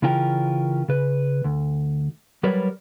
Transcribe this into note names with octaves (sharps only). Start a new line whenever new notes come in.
C#3 E3 C#4 F4 A#4 G5
C#3 B4
D2
F#3 G3 A#4 B4 C#5 D5